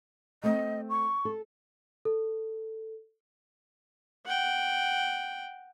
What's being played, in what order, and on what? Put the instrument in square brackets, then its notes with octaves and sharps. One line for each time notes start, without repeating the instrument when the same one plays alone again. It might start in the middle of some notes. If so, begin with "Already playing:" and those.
[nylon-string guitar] A3 C4 [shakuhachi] D#5
[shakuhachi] C#6
[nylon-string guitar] A4
[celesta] A4
[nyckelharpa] F#5 G5